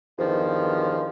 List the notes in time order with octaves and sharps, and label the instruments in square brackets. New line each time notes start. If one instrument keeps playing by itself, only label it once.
[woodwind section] E2 G2 D#3 F3